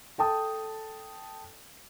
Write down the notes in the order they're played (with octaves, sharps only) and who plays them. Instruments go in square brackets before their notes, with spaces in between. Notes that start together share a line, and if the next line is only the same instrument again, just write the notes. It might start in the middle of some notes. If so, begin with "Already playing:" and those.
[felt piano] A4 G5 A5 D#6